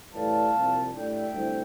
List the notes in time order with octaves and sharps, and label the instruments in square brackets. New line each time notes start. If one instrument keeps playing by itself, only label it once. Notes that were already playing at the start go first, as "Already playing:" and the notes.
[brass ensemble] A2 E3 G3 F5 A5
C2 A#2 F3
A2 G3 D4 E5 G5
D2 C3 G3 C4 E4